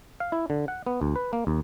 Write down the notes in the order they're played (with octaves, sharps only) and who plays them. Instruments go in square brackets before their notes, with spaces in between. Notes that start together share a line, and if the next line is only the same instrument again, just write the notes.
[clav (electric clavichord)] F5
E4
D3
F#5
B3
D2
B4
A#3
D#2